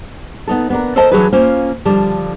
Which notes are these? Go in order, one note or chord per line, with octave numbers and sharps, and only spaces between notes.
B3 D#4 A4
B3 D4 A#4
A4 A#4 C5 D#5 A5
E3 F#3 D4 F#4 G#4 B4
A#3 C#4 F4 C5
D3 F3 G3 A4